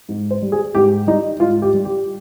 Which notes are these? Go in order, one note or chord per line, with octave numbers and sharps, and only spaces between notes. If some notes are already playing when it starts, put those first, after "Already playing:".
G#2
C5
G3
G#4
G#2 G4
G3 D#4
G#2 F4
G4
G3
G4